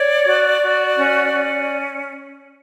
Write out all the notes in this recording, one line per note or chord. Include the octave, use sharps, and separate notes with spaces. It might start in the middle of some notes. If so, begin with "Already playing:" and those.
Already playing: C#5 D5
F#4
F#4
C#4
C#4